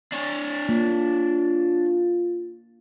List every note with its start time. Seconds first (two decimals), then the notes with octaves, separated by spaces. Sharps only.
0.12 D4 C#5
0.69 A#3 F4